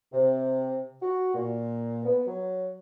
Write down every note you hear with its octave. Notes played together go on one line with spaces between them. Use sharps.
C3
F#4
A#2
B3
F#3